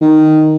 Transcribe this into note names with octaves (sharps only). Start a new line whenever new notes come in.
D#3